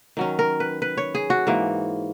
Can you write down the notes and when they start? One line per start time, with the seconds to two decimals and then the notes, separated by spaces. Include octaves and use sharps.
0.17 D#3 F#3 C#4
0.39 A#4
0.60 B4
0.82 B4
0.97 C#5
1.15 G#4
1.30 F#4
1.47 G#2 E3 A#3